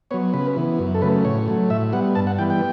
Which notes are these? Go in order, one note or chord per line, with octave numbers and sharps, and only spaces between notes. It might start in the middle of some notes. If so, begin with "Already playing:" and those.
F#3 B3 C#5
C#3 B4
E3 B3
F#2
A4
C#3 F#3 A3 B4
A2 C#5
F#3 A3
A2 E5
G3 B3 F#5
G2 A5
F#5
E3 G3 B3 G5
G5